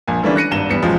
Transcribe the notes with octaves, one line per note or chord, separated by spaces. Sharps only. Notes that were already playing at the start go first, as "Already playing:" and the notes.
A#1 A#3 G#5
D3 E3 G3 A#3 C#4 D4
F#6 A#6 C#7 D#7
G#1 G2 E7 G7
E2 E3 G3 C#7
E1 A1 F3 G#3